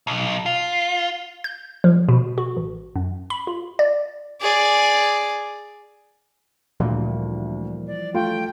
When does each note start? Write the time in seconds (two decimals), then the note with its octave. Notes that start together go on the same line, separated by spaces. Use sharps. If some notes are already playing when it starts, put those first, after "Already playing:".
0.07 B1
0.46 F4
1.44 G6
1.84 F3
2.09 B2
2.38 F#4
2.57 A1
2.96 F#2
3.30 B5
3.47 F4
3.79 D5
4.41 G#4 D5
6.80 D2 A#2 E3 F3 G3
7.87 D5
8.14 A3 F4 G5